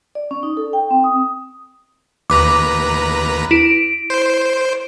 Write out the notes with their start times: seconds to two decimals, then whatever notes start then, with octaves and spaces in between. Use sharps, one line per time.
0.15 D5
0.31 C#4
0.43 D#4
0.57 A4
0.73 G5
0.91 C4
1.04 D#6
2.30 D#2 B4 A#5 D6
3.51 E4 D7
4.10 C5